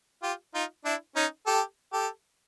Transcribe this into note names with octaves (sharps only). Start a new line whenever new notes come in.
F4 G4
D#4 F4
D4 E4
C#4 D#4
G4 A4
G4 A4